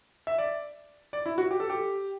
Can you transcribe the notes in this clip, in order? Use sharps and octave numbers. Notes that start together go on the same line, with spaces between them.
E5
D5
D5
E4
F#4
G4
A4
G4